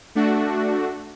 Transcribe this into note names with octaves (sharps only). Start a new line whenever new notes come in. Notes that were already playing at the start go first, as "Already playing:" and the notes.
A3 D4 F#4